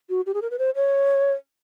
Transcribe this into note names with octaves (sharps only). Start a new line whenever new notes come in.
F#4
G4
G#4
A#4
B4
C5
C#5